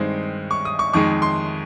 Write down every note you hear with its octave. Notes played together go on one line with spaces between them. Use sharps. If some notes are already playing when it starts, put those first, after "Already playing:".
Already playing: G2 D#3 G#3 C4 D#4
C#6
D#6
C#6
F2 D#3 G#3 C#6
C6